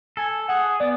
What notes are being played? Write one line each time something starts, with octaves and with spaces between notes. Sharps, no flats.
A4 G#5
G#4 F#5
B3 D5